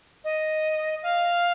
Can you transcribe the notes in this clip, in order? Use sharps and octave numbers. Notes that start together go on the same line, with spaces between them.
D#5
F5